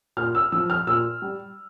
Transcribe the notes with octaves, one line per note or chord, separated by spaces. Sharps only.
A#2 F6
E6
F3 E6
F6
A#2 E6
G3